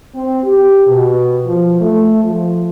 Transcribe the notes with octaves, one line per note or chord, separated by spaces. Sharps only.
C4
G4
B2
F3
A3
F3